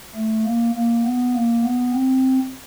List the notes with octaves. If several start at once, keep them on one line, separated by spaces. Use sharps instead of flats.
A3
A#3
A#3
B3
A#3
B3
C4